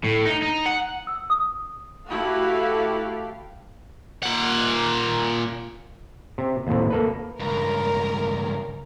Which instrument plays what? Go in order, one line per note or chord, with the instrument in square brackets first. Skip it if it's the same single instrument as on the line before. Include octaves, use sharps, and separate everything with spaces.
[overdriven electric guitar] A2
D#4
D#4
F#5
[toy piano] E6
D#6
[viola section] A3 E4 F#4 [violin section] G4 A4 F5
[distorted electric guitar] A#2 F#5
[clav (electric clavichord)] C3
D#2 A2 C3
A#3 A4 B4
[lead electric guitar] C#2 G2 [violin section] A#4